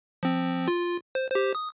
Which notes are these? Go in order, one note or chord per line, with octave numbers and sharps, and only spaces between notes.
F3 C4
F4
C5
G4 C5
D#6